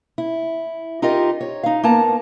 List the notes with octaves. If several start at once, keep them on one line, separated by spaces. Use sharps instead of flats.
E4
D#4 F4 G4 A#4 D#5
C#5
D#4 F5
A#3 B3 A#4 A5 A#5